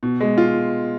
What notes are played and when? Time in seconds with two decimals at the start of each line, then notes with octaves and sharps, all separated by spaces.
0.03 B2
0.21 G#3
0.38 F4